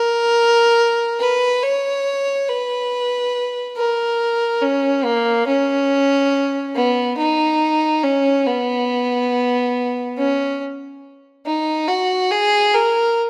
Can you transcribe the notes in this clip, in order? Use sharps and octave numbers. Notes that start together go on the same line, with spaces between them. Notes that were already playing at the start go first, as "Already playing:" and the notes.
Already playing: A#4
B4
C#5
B4
A#4
C#4
A#3
C#4
B3
D#4
C#4
B3
C#4
D#4
F#4
G#4
A#4